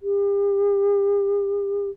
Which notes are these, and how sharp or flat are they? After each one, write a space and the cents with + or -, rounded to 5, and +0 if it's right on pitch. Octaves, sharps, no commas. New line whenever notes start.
G4 +40